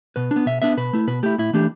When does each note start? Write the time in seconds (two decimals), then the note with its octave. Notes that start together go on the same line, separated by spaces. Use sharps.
0.16 B2 B4
0.31 D4
0.36 B3
0.46 B2 E5
0.62 B3 D4 E5
0.77 B2 B4
0.93 A3 E4
1.07 B2 B4
1.23 A3 E4 G4
1.38 A2 E4
1.53 E3 A3 D4 G4